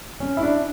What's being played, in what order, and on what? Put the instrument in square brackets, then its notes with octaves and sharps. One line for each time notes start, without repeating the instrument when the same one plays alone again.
[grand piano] C#4
E4
D4